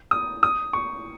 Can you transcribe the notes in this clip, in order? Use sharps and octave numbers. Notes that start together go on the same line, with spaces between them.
D#6
D#6
C#6